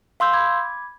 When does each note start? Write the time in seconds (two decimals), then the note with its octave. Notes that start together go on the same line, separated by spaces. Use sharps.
0.20 F5 C6 E6 G6
0.33 B5 D6 G#6